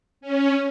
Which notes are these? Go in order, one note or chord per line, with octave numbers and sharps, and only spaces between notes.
C#4